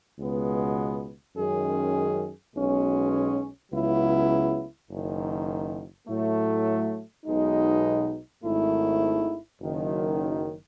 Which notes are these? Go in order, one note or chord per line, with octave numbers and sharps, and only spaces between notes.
C#2 B2 G#3 B3
F#2 D#3 G#3 C#4 G#4
B1 B2 G#3 C#4
C#2 C#3 F#3 B3 E4
F#1 F#2 D#3
A2 F#3 A3
B1 B2 G#3 D#4
G#1 G#2 D#3 A3 E4
F#1 F#2 D#3